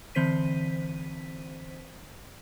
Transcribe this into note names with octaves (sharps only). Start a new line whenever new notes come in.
D3 E3 C4 C5 B6 D#7